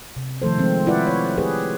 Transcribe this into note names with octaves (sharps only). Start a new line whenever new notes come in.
C3
D#3 F3 A3 A4 C5
F3 G#3 C4
E4 F4 B4 C5 D5 F#5
C#5
G4 G#4 B4